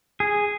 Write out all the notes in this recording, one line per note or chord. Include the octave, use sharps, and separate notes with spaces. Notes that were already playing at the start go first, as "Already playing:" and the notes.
G#4